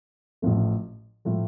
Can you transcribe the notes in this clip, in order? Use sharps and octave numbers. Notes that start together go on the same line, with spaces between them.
A1 A2 F3 A3
A2 F3 A3